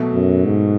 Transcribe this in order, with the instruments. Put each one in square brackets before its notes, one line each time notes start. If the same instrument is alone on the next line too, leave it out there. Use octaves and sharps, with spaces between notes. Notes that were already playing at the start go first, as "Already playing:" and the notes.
Already playing: [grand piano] B2 F#3 A3
[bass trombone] F#2
G#2